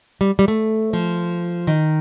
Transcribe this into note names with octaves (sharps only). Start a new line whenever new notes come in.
G3
G3
A3
F3
D#3